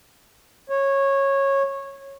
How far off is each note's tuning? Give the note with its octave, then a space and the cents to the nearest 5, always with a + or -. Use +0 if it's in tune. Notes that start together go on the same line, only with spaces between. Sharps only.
C#5 -15